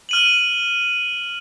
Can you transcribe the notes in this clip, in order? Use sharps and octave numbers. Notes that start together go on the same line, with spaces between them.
F6 D#7 F#7